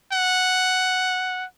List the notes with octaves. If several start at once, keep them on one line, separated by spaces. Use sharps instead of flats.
F#5